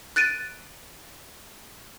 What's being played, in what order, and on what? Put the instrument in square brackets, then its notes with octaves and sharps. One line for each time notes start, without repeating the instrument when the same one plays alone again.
[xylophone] F#6 A6 D7 D#7